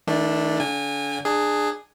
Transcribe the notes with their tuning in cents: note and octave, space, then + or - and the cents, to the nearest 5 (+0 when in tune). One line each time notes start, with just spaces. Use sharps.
D#3 +40 A3 +0 D4 +0
D3 -40 G#5 -30
D4 +25 G#4 +0